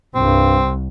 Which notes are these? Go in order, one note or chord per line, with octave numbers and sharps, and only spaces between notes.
C2 G2 C4